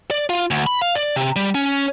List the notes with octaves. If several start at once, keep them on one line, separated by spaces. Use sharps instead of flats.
D5
F4
D2
B5
F5
D5
C3
G3
C#4